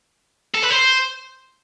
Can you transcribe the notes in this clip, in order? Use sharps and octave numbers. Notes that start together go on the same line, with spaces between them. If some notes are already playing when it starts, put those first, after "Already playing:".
A4
B4
C5